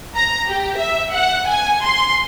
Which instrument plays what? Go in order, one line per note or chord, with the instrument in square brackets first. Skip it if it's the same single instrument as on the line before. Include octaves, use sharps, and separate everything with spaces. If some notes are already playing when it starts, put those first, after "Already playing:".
[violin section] A#5
G4
E5
F#5
G#5
C6